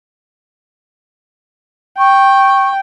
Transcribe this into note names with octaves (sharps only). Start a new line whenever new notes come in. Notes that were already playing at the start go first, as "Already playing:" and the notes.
G5 C#6